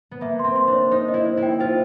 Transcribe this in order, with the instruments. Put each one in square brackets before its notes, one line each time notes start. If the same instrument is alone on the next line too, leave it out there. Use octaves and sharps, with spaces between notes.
[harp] B3
[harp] A#3 [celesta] E5
[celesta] C6
[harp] C4
[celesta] C6
[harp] D4
[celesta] C#5
[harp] D#4 [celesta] C5
[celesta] D#5
[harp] E4
[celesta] C5
[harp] E4
[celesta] G5
[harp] F4 [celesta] C5